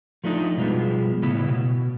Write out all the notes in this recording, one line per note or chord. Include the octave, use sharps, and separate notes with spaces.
F3 A3 D4 D#4
B2 F3 G3 G#3 B3
A2 C#3 B3 E4
B2